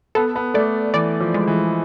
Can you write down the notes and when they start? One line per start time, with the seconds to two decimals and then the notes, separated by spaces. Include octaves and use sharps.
0.15 B3 A4
0.36 B3
0.54 A3 D5
0.94 E3 D5
1.20 F3
1.34 G#3
1.47 E3